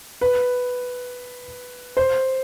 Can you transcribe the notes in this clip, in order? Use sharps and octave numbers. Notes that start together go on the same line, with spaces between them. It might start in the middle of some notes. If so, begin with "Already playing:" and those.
B4
C5